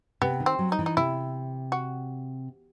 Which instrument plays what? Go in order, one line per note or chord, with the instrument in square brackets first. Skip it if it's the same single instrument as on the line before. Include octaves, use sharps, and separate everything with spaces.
[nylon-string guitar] C3 [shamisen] B3
[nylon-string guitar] D#3
[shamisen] C4
[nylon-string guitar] F#3
[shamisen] D#4
[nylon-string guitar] E3
[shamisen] D#4
[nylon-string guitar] C3 [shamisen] E4
[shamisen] F#4